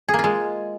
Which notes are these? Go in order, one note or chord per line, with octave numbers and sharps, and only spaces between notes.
G#4
A#3
F4
G#3